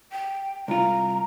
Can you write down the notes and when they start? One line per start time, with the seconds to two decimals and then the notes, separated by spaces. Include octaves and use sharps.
0.12 G5
0.68 C2 F4 A#5